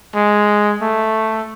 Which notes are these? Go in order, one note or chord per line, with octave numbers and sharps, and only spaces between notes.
G#3
A3